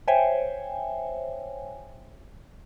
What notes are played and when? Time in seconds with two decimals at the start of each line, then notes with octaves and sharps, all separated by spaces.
0.08 C5 C#5 E5 G5 G#5